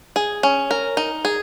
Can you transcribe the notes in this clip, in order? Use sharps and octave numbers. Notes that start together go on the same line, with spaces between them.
G#4
C#4
A#4
D#4
G#4